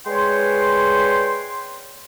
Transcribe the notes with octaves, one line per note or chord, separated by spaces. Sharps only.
G#3 B4 C#5 D5 G5 C6